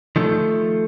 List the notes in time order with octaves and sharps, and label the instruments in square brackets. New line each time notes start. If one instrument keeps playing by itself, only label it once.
[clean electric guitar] D#3 F3 A3